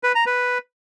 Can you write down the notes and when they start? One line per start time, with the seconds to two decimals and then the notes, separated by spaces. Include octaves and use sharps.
0.03 B4
0.15 A#5
0.26 B4